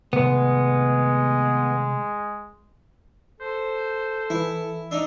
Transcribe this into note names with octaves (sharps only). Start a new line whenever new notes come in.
C3 D#3 G#3 A3 B3
A4 C5
E3 E4
D4 D#4 E6